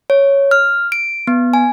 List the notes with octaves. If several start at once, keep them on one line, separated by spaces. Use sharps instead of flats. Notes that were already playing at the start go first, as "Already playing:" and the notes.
C#5
F6
D7
B3
G#5